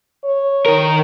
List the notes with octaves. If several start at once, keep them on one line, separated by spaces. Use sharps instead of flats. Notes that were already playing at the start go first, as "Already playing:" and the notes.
C#5
D#3 A#4